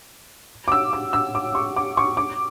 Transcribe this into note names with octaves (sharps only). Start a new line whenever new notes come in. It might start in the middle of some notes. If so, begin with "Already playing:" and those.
D6
E6
D6
E6
D6
C#6
D6
C#6
D6